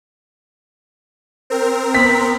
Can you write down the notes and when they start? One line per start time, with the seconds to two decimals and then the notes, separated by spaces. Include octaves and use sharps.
1.50 C4 A#4
1.95 B3 B6